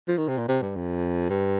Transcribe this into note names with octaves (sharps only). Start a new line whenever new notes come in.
F3
D#3
C3
A#2
C3
G2
F2
G2